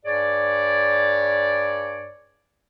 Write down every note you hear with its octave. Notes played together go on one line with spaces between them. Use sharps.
G2 G#4 C#5 D5